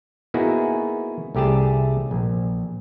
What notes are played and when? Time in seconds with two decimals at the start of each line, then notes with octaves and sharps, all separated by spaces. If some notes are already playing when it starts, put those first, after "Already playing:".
0.34 A#3 B3 D#4 E4 F#4 G#4
1.35 C2 A3 G4 G#4 A5
2.11 A#1